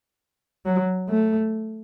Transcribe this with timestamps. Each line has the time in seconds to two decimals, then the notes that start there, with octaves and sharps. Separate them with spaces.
0.65 F#3
1.09 A3